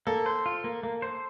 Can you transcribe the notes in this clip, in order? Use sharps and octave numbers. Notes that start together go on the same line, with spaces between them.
A#3 A4
C5
F4
A#3
A#3
C5